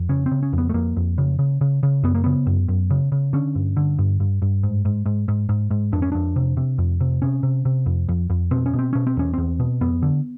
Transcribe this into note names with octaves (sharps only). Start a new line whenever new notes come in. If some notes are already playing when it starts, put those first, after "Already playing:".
Already playing: F2
C#3 C#4
C4
C#3
C#4
F2
B3
A3
F2 A#3
F2
C#3
C#3
C#3
C#3
F#2 B3
A#3
C#3 B3
F#2
F#2
C#3
C#3
D3 C#4
G2
D3
G2
G2
G2
G#2
G#2
G#2
G#2
G#2
G#2
F2 D4
C#4
F2 D4
C3
C3
F2
C3
C3 C#4
C3
C3
F2
F2
F2
B2 C4
C#4
B2
C4
B2 C#4
C4
E2 C#4
E2 C4
B2
F2 B3
D3